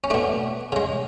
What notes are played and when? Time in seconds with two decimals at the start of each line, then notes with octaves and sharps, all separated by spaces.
0.04 C#4
0.10 B2 A3 D4
0.72 C#3 G#3